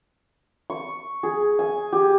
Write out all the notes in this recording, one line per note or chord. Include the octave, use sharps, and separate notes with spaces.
C#6
G#4
G#5
G4